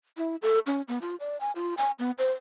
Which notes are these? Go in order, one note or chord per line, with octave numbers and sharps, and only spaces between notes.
E4
A4
C#4
B3
F4
D5
G#5
F4
G#5
B3
C5